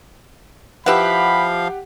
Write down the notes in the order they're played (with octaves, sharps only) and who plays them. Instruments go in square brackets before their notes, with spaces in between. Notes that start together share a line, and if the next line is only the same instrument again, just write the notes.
[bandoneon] F3 F5 [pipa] E4 B4 [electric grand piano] G4 F#5 [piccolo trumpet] B5